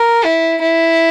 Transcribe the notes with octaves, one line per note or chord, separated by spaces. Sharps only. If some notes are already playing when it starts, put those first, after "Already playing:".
Already playing: A#4
E4
E4